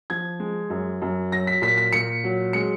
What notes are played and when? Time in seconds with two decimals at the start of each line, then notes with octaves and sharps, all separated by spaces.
0.10 F3 G#6
0.40 G#3
0.70 F#2
1.02 F#2
1.32 F#3 A#6
1.47 B6
1.62 A#2 B6
1.78 B6
1.93 A#2 C#7
2.24 F#3
2.53 G#3 C#7